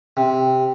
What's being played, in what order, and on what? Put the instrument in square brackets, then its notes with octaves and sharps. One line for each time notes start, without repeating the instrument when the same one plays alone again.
[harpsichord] C3